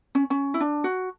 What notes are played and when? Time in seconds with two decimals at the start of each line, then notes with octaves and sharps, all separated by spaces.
0.15 C#4
0.30 C#4
0.54 E4
0.60 D4
0.84 F#4